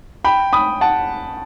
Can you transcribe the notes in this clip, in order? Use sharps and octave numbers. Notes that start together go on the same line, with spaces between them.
G5 B5
B5 D#6
F#5 A5